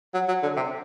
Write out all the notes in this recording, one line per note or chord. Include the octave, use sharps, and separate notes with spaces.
F#3
F#3
D3
C3